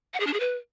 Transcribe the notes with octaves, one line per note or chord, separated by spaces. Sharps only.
F#5
G#4
D4
G#4
B4